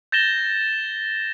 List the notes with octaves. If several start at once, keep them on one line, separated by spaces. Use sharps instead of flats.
G6 A6 A#6 E7 G7